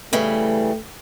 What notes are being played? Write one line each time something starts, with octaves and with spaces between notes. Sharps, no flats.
C#3 E3 G3 A3